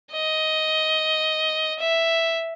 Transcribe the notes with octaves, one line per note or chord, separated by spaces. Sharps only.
D#5
E5